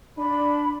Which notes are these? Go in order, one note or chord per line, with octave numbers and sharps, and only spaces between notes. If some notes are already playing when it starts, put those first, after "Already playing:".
D4 B5